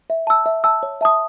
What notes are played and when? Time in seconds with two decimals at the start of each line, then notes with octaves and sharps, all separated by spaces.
0.10 E5
0.27 A5 E6
0.46 E5
0.64 A5 E6
0.83 C#5
1.01 E5 A5 D#6